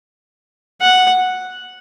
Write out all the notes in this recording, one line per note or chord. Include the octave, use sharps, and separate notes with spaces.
F#5